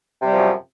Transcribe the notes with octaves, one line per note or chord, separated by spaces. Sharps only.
F#2 C3 F3 G3